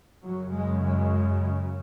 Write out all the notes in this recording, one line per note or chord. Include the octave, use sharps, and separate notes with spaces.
F#2 C#3 F#3
G#3
G#3